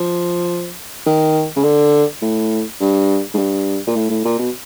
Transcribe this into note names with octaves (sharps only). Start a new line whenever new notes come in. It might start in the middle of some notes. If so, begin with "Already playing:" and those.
Already playing: F3
D#3
C#3
D3
A2
G2
G#2
G2
A#2
A2
A2
A#2
B2